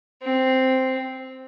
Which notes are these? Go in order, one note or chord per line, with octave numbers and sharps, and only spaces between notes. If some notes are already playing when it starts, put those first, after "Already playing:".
C4